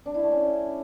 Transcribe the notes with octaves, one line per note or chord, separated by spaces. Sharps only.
D4
E4
A3
C#4